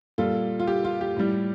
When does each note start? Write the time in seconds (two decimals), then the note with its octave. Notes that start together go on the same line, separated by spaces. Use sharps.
0.18 A#2 G3 F4 A4
0.60 F4
0.67 G4
0.84 F4
1.01 G4
1.17 A2 G3